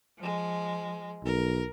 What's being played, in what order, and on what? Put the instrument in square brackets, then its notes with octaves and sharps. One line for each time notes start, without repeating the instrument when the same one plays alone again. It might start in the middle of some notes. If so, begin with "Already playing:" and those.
[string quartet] F3 G#3
[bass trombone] B1 [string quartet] A#4